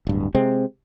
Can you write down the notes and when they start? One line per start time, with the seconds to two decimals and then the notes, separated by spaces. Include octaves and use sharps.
0.07 D1 G2
0.35 C3 G#3 C4